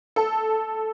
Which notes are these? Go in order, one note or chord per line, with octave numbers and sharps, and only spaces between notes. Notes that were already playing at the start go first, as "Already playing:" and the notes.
A4